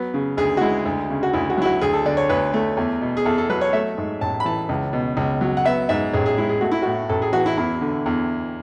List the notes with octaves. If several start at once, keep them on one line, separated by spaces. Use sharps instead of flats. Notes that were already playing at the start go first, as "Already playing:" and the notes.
Already playing: F#3 B3
C#3
D2 G#4
F#4
G#3 E4
D2
C#3
F#4
D2 E4
F#4
F#3 E4
F#4
D2 G#4
A4
D3 D5
C#5
D2 B4
A3
E2
B2
G#4
E2 A4
A4
F#3 B4
C#5
A3 E5
G#2
A1 A5
B5
E3 A5
C#2
B2
C#2
F#3
F#5
B3 E5
G#2 E5
A1 G#4
G#4
G#3 E4
G#4
A3 F#4
E4
A2 F#4
A1 A4
G#4
E3 F#4
E4
E2 E4
D3
E2